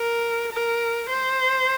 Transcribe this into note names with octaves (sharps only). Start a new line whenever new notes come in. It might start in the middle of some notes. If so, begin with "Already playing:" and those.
Already playing: A#4
A#4
C5